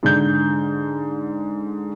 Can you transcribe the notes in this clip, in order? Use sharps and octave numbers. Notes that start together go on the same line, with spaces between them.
G#2 D3 G6